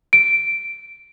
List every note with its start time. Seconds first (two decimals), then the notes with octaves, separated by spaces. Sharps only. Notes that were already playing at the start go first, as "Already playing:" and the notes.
0.13 D7